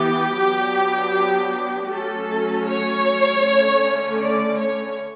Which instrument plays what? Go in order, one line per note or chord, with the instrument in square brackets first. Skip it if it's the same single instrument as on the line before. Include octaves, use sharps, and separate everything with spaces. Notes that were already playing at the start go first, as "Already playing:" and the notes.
Already playing: [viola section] E3 B3 G4
F#3 B3 D4
F#3 A3 C#4 A4
C#5
D3 A3 C#4
D5
C#5